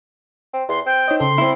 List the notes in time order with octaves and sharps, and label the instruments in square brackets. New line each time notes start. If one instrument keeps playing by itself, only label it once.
[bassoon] C4
[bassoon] E2 [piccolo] C6
[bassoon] C4 [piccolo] G5
[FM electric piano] D#4 C#5 D#5
[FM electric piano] C#3 A4 [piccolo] C6
[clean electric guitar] C4 E4